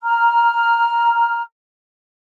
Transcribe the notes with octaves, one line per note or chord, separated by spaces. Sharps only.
A#5 F6